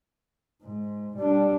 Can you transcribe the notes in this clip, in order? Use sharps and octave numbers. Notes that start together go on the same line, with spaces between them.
G#2
G3 D4